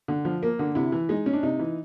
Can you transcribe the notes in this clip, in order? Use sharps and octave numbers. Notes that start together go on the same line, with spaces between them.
D3
F3
A#3
D3
C3 E4
E3
G#3 D#4
C#4
D4
C3 D#4
E3